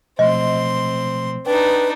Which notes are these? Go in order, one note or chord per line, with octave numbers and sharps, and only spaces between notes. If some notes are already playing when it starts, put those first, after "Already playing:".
B2 F3 A3 C4 D#5 C6
D4 D#4 B4 G5